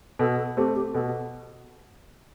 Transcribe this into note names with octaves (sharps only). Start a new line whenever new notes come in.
B2 A4
A4
A3 C4 G4
G4
B2 A4